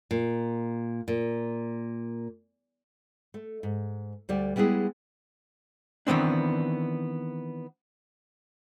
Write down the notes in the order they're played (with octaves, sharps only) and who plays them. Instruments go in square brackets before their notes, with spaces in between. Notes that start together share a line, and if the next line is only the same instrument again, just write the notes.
[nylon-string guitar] A#2
A#2
A3
G#2
D2 G3 D5
G3 G#3 B3 E4 G#4
[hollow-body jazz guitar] D#3 E3 B3 C4 D4